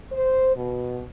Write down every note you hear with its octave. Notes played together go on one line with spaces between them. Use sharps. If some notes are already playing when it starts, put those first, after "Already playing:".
C5
B2